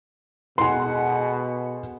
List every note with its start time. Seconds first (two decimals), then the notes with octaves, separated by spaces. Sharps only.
0.58 B2 G#3 A4 F#5 G#5 C6